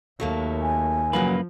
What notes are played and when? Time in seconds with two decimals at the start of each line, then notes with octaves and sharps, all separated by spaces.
0.20 D#2 F#3 A3 A#3
0.62 G#5
1.13 F#2 A#2 C#3 F3 F#3 A#3 B4